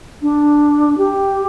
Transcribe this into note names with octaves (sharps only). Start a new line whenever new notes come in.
D4
G4